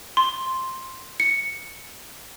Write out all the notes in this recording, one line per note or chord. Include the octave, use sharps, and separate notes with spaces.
C6
C#7